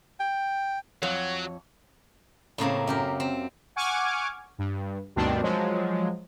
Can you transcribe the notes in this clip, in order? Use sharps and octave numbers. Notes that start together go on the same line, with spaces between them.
G5
F2 F#3 C#5
A2 C#3 A#3 C4
F#2 G4 A#4
C4
F#5 G#5 C#6 D6 F6 G#6
G2
D2 G2 B2 D#3 C4 D4
F3 F#3 G#3